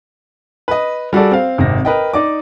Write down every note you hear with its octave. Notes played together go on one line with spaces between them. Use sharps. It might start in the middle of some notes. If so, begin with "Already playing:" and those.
B4 D#5
G3 F#4 G#4 A4 D5
C4 F5
G#1 C3 A#6
A#4 B4 D#5 G5
D#4 D5 D#5 D6